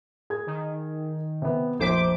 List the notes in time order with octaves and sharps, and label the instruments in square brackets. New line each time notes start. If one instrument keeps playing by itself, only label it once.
[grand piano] G#4 G#6
[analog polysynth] D#3
[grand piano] C3 B3
[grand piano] F1 A#1 B6 [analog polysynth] C5 D6